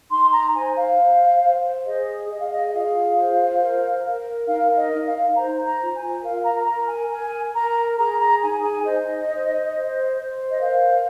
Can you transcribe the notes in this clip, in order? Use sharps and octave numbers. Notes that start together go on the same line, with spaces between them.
D#4 C6
A#5
C5 G#5
F5
C5
C5
G#4 D#5
G#4 D#5
F5
D#5
D#5
F4 F5
C5
A#4
A#4
D#4 F5
D#5
D#4
F5
C5 A#5
A#5
F4
G#5
A#4 F5
A#5
A#4 A#5
G#5
A#4 G#5
A#4 A#5
G#4 A#5
A#5
D#4 G#5
G#5
C5 D#5
C5
C5
C5
D#5
A#4 F5